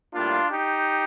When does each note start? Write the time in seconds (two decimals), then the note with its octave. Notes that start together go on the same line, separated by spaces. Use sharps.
0.14 A2 G3 A#3 D4 F4
0.50 D#4 G4